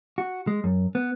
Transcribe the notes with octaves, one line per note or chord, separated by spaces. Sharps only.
F#4
G#3
F#2
B3